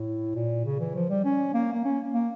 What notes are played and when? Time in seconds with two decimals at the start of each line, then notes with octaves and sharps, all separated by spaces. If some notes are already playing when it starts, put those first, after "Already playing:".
Already playing: A2
0.35 A#2
0.65 C#3
0.80 E3
0.95 F3
1.10 G3
1.24 C#4
1.54 A#3
1.73 A#3
1.85 C#4
2.13 A#3